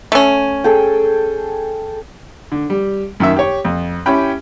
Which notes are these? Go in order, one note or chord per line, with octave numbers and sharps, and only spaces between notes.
A3 C#4
G#4 A4 G5
D3
G3
F#2 D#3 E5
G4 C#5
F2
C#4 E4 G4 G5 B5